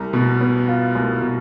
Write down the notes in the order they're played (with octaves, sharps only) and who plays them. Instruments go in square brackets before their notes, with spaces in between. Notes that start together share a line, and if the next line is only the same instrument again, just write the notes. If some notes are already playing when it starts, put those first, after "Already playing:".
Already playing: [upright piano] C2
B2
B3
F4
C2
B2